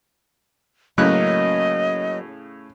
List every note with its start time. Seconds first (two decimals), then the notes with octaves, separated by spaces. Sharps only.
0.98 A2 C#3 F#3 A#3 C#4 D#5 F#6